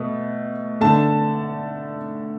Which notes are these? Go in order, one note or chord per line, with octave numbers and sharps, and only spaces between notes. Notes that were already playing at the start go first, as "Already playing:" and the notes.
Already playing: B2 A3
D3 A3 A5